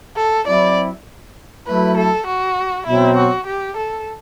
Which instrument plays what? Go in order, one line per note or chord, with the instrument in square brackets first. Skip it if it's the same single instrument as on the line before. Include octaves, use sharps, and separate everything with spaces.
[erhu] A4
[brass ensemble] F#3 C4 E4 [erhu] D5
[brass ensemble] F#3 A3 E4 [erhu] B4
[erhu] A4
F#4
[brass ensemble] B2 F#3 C4 [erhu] E4
[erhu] F#4
G4
A4